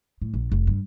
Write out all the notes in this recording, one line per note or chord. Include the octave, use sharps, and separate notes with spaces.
A2
A#1
F1
G2